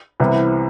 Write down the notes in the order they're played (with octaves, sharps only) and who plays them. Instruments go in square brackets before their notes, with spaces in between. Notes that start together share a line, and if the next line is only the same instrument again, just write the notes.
[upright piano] C2 C3 E3 B3